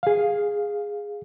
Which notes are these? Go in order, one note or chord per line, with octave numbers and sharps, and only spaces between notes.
G#4 F5